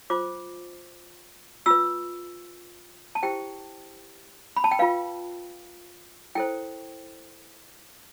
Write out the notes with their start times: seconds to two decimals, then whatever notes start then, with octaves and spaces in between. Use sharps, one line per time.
0.10 F4 C5 D6
1.66 F4 B4 E6
3.15 A5
3.23 E4 G4 C5 G5
4.57 B5
4.64 A5
4.71 G5
4.79 F4 B4 F5
6.35 E4 A4 C5 G5